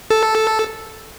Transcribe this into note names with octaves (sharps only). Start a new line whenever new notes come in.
A4